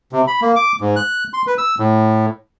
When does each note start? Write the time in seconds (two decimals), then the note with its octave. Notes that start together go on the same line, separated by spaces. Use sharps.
0.12 C3
0.27 B5
0.42 A#3
0.56 D6
0.81 G#2
0.96 F#6
1.33 C6
1.47 B4
1.58 E6
1.79 A2